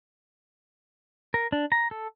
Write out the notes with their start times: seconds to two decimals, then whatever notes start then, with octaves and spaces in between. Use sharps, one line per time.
1.34 A#4
1.52 D4
1.72 A#5
1.91 A4